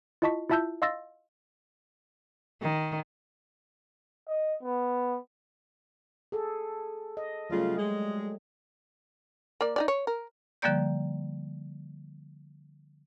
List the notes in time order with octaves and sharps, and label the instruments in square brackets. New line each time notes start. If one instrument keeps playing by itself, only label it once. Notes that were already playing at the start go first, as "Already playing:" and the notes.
[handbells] E4 F4 D#5 A5 C#6 B6
E4 F4 E5 A5 E6 G6
D#5 F5 C6 E6 A6 A#6
[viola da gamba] D#3
[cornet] D#5
B3
[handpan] G#4 A4
D#5
[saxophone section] C#3 F4 [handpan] F#3 G3 A3
[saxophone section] G#3
[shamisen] A#3 D5
D#4 G4 D5
C#5
A#4
[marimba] D3 F3 G3 A#3 D5 G6